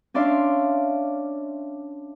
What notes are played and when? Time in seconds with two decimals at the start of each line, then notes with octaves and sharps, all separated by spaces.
0.14 C#4 D4 D5 E5 F5 C6